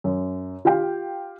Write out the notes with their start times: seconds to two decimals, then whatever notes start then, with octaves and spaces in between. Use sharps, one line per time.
0.04 F#2
0.65 F4 G4 F5 G5